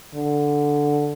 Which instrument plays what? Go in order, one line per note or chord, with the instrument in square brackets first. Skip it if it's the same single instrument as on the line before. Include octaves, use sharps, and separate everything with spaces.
[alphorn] D3